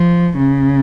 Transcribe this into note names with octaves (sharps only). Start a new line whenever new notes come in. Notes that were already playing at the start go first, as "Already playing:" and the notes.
Already playing: F3
C#3